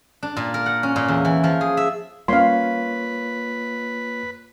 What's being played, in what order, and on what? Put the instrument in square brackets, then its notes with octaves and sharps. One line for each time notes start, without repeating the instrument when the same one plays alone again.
[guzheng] D4
A#2
A#4
F#5
C#4
A#2
E2
E3
F3
G#4
E5
[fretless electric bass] G3 C#4 [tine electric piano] A#3 F4 C#5 [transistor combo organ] B4 [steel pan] F5 C6